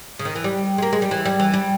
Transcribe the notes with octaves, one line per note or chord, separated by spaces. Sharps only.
C#3
D#3
E3
G3
G#3
A#3
G#3
G3
E3
G3
E3
G3